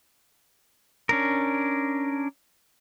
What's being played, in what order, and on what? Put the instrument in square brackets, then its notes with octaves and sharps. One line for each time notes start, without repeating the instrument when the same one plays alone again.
[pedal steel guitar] C#4 D4 A#4